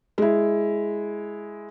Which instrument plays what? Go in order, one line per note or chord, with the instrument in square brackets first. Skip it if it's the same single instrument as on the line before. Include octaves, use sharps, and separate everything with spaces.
[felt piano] G#3 E4